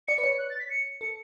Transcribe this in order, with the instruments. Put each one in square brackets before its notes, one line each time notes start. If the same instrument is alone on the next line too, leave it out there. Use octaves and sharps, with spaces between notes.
[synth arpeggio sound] D5 [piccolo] C#7
[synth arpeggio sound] B4
[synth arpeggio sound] C#5 [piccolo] C#7
[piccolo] F#6
A6
B6
C#7
[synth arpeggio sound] A4 [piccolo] C#7